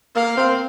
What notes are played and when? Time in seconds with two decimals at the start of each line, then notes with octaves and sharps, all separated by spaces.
0.16 A#3 F5
0.37 C4